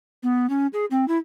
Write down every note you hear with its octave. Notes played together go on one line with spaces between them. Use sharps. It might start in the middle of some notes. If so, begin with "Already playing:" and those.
B3
C#4
G#4
C4
E4